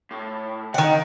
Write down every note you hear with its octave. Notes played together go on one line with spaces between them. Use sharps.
A2
D#3 F#5 G5